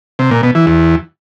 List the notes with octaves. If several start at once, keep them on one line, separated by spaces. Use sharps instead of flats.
C3
A#2
B2
E3
E2